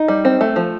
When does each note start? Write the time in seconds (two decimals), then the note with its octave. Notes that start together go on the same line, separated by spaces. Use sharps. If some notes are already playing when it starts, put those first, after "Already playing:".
Already playing: D#4
0.08 G3
0.25 C4
0.41 A3
0.56 F3